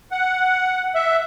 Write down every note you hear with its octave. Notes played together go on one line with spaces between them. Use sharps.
F#5
E5